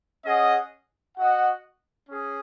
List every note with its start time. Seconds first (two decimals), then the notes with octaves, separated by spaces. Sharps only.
0.25 C#4 G#4 D#5 F#5
1.17 F#4 D#5 F#5
2.10 C#4 G#4